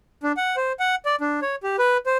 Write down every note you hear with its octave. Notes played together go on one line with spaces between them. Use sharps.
D4
F#5
C5
F#5
D5
D4
C#5
G4
B4
C5